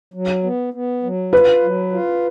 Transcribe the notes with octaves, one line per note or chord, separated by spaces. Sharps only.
F#3
B3
B3
F#3
F4 B4
F#3
F4